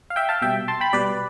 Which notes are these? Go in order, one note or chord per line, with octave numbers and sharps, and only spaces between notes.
F5
E5 G5
F5 A5
B2 G3 E5 G5
A5 C6
G5 B5
B2 G3 B4 D5